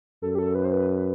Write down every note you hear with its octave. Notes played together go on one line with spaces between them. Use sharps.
F#2 A4
G4
A4
B4
C5
B4